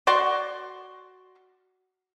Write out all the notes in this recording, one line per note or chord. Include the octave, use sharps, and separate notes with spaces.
F#4 D5 C6 C#6